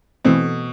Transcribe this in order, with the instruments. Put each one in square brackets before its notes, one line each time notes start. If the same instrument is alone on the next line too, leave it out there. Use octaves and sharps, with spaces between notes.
[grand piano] B2 [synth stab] E3 A3 C4